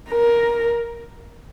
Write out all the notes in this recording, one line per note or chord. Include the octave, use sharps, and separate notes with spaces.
A#4